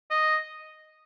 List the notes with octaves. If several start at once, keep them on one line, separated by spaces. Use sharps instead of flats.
D#5